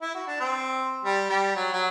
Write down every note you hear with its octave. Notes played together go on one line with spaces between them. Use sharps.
E4
F#4
D4
C4
G3
G3
F#3
F#3